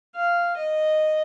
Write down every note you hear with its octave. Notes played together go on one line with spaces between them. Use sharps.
F5
D#5